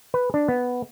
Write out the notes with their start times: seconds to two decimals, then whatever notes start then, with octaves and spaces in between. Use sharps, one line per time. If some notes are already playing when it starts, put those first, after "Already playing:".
0.14 B4
0.34 D4
0.48 B3